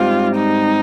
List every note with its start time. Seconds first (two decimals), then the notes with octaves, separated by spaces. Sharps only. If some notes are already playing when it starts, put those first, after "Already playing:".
Already playing: G#2 G3 C4 F4 G4
0.36 D#4